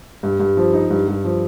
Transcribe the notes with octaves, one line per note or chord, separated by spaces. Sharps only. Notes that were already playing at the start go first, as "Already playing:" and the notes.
G2
G2
F3
D#4
G2
G2
F3